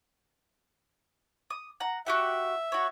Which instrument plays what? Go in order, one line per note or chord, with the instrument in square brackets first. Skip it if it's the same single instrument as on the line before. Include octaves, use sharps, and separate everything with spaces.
[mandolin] D#6
F#5 A#5
[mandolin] F#4 G4 F#5 [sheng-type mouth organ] E5
[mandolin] F#4 C#5